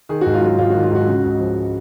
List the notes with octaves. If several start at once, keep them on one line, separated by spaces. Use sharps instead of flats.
D#3 G#4
G#2 F#4
F4
F#3 F#4
G#2 F4
D#3 F#4
F4
G#2 F#4
C#3
C#2
F3